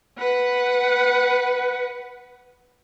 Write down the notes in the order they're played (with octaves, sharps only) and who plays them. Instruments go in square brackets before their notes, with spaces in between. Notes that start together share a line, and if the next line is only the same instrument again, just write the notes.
[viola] B4 F#5